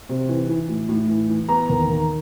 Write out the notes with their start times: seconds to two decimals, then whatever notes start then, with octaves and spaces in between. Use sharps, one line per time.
0.09 C3
0.29 E3
0.49 E3
0.69 A2
0.89 A2
1.09 E3
1.29 E3
1.49 B3 A#5
1.70 D#2
1.89 D#3